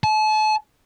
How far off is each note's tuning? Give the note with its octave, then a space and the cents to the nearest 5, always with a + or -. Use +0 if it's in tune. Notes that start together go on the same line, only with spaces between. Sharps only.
A5 -35